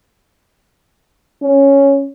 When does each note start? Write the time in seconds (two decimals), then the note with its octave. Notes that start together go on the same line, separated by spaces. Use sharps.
1.42 C#4